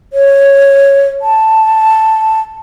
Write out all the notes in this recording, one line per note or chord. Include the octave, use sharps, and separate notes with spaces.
C#5
A5